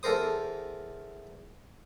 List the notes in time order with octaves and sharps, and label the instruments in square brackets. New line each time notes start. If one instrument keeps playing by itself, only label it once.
[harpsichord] E2 A4 A#4 C5 D#6